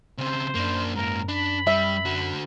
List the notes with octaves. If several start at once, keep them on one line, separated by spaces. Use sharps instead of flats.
C#3 C4 C5
F#2 A#3 D4
G#2 A#3 A#4
D4 B5
G3 E5
D3 F#4